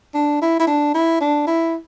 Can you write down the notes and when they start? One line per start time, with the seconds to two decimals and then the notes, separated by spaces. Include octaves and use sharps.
0.14 D4
0.42 E4
0.60 E4
0.67 D4
0.95 E4
1.21 D4
1.47 E4